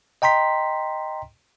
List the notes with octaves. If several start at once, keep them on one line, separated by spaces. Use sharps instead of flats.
D#5 G5 A#5 C6 B6